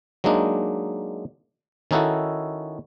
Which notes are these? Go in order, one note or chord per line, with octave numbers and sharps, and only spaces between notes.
F#3 G#3 A#3 D4 D#4
D#3 C#4 D#4 E4 F#4 A4